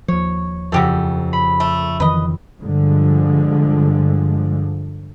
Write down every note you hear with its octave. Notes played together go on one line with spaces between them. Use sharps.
D#2 F3 C#5
F2 C#3 F#4 G4 A4
B5
A3
F2 D#3 E3 B4 D#5
G2 D3 F3 G#3